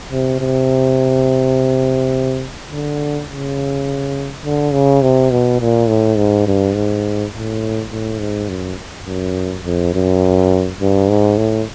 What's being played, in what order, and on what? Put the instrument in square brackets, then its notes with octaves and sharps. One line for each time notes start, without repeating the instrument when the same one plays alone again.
[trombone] C3
C3
D3
C#3
D3
C#3
C3
B2
A#2
A2
G#2
G2
G#2
A2
A2
G#2
F#2
F#2
F2
F#2
G2
G#2
A2